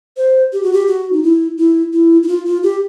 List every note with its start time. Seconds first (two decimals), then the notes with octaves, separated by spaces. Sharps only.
0.17 C5
0.53 G4
0.63 F#4
0.73 G4
0.87 F#4
1.12 D#4
1.23 E4
1.58 E4
1.93 E4
2.23 E4
2.28 F4
2.45 F4
2.63 G4